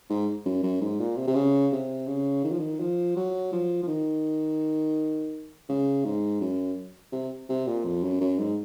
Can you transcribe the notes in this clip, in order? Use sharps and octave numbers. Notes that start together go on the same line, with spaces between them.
G#2
F#2
F#2
G#2
A#2
C3
C3
C#3
C3
C#3
D#3
F3
D#3
F3
F#3
F3
F3
D#3
C#3
G#2
F#2
C3
C3
A#2
F2
F#2
F#2
G#2